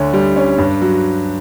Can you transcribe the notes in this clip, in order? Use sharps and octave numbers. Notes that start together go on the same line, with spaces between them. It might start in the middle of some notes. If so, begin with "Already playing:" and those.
Already playing: D2 D3 C#5
G3
C#4
G2
F#3